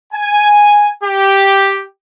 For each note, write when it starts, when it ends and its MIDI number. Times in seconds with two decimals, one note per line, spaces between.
0.13 0.87 80
1.03 1.83 67